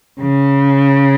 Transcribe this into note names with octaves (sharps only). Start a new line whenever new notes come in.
C#3